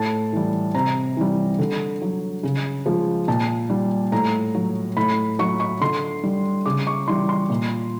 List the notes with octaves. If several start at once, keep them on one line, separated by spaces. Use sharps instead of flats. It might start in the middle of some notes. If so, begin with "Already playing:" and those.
Already playing: A2 A5
E3 G3
C3 A#5
E3 G3
D3
F#3
C#3
F3 G#3
A#2 A5
G3
A2 A#5
F#3
A2 B5
F#3 C#6
C#6
D3 C6
G3
C#3 D6
C#6
E3 G3 C6
C6
A#2